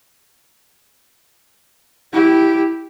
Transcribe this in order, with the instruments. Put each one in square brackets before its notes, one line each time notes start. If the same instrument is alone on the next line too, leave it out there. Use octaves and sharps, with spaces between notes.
[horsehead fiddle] E4 G4